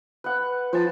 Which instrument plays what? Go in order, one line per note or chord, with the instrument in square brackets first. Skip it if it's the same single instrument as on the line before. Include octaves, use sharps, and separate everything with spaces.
[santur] B4 F#5
[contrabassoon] F3 [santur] C5 A5